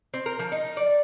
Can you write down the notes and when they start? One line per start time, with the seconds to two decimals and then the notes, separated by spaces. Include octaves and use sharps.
0.14 C4
0.26 A#4
0.39 F3
0.52 D#4
0.77 D5